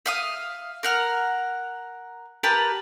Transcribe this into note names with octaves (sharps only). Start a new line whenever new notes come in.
E5 F5 D#6
A#4 F#5 F6
G4 A#4 B4 A5